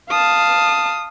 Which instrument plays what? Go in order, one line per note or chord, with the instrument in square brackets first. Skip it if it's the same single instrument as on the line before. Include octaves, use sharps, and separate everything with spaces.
[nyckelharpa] F5 A5 [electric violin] D#6